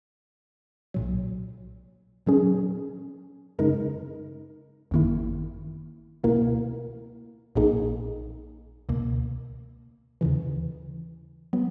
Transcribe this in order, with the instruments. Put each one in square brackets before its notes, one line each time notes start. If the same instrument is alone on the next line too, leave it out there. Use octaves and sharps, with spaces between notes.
[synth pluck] B1 A#2 F#3
A#2 F#3 C#4 G#4
F#2 C#3 G#3 D#4 A#4
G#1 F#2 D#3 A#3 E4
C#2 B2 A#3 E4 A#4
A#1 A#2 A#3 D#4 G#4
C#2 B2 A#3
D#2 C#3 E3
F#3 B3